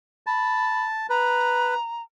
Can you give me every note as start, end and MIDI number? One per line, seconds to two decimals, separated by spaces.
0.27 1.07 81
0.27 0.87 83
1.10 1.75 71
1.10 2.02 82